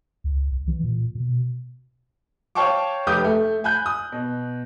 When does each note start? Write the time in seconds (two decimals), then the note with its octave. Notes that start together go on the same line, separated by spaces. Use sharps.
0.24 C#2
0.52 C2
0.67 E3
0.83 A#2
1.15 B2
2.55 C#5 F5 G5 A5 C#6 D6
3.07 F1 G4 B4 D6 D#6 G6
3.25 A3
3.64 G#5 B5 F#6 G6
3.86 D#6
4.12 B2